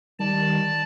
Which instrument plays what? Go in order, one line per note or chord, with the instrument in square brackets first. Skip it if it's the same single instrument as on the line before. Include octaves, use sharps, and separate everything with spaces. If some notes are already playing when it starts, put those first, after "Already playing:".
[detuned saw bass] D#3 [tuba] G3 [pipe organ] D5 A5